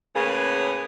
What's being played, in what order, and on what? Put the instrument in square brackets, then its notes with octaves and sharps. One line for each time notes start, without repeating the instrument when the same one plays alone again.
[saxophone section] A2 C#3 A#3 B3 C#4 G#4